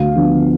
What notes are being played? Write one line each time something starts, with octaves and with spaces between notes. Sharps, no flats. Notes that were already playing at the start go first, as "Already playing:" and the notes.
Already playing: D2 F5
D3 F3 B3